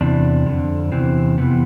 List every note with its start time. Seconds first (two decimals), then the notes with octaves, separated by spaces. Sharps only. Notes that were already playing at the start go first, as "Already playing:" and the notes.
0.01 E2 C3 E3 D4
0.46 F2 D3
0.92 E2 C3 E3 C4
1.38 F2 C3 E3 B3